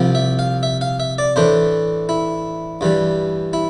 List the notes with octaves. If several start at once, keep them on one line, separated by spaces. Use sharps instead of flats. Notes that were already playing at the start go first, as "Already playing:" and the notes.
Already playing: C2 C3 F3
E5
F5
E5
F5
E5
D5
A2 E3 A3 D4 C5
E4
G2 E3 G3
E4